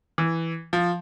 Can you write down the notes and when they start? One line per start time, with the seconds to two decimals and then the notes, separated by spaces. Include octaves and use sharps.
0.18 E3
0.73 F3